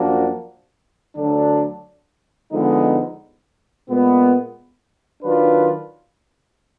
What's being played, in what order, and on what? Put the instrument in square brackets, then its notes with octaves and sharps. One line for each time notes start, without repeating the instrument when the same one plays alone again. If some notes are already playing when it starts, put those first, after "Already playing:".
Already playing: [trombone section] F#2 F3 A#3 D4 F#4
D2 D3 F#3 D4
D3 F3 G#3 B3 D#4
A#2 G#3 B3
D#3 F#3 D4 F4 B4